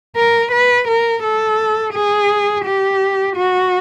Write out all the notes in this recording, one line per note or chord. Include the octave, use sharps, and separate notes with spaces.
A#4
B4
A#4
A4
G#4
G4
F#4